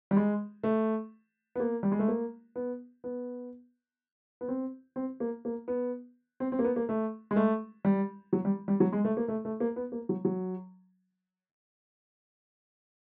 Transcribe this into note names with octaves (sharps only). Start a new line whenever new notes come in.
G3
G#3
A3
B3
A#3
G3
G#3
A3
A#3
B3
B3
B3
C4
C4
A#3
A#3
B3
C4
C4
A#3
B3
A#3
A3
G#3
A3
G3
F#3
G3
G3
F#3
G#3
A3
A#3
A3
A3
A#3
B3
A#3
F#3
F#3